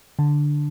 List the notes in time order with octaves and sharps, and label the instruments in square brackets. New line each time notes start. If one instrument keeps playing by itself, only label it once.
[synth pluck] D3